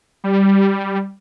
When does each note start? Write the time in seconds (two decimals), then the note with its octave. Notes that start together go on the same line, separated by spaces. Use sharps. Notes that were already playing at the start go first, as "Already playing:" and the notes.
0.24 G3